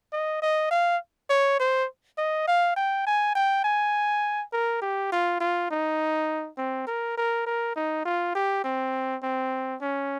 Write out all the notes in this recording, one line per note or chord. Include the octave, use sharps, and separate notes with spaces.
D#5
D#5
F5
C#5
C5
D#5
F5
G5
G#5
G5
G#5
A#4
G4
F4
F4
D#4
C4
A#4
A#4
A#4
D#4
F4
G4
C4
C4
C#4